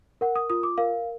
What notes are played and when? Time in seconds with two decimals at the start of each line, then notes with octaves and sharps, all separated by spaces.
0.21 A#4 F#5
0.36 D#6
0.50 F4 D#6
0.63 D6
0.78 A#4 F5